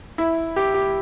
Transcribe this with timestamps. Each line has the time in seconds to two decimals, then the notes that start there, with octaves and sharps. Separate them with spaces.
0.18 E4
0.56 G4
0.74 G4